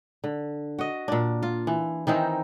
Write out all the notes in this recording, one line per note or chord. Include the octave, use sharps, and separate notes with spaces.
D3
F#4 D#5
A#2 D4
F4
E3
D#3 E3 C4 D#4